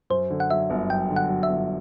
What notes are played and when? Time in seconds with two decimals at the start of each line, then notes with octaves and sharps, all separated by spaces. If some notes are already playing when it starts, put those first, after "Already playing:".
0.10 F#2 C5
0.30 D3
0.40 F#5
0.50 F#3 E5
0.70 G1
0.89 F#2 G5
1.10 D3
1.16 F#5
1.29 F#3
1.43 E5
1.49 G1